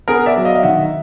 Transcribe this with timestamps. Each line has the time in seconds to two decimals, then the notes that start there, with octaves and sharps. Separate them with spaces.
0.08 B3 G#4 A#4
0.26 D5 E5
0.36 F#3
0.45 D#5 F5
0.55 F5
0.63 D#3 E5 F#5